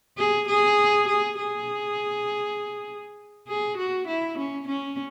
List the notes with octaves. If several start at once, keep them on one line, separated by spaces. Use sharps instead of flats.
G#4
G#4
G#4
G#4
G#4
F#4
E4
C#4
C#4